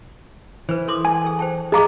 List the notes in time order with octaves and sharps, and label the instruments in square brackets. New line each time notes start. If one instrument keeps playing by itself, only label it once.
[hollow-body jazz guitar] E3 [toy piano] B4 C5
[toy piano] A4 C6 D6
[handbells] G#5
[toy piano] G#4 A4
C5 G5 A5
[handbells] G#4 A#5 D6 [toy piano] D#5 F5 A5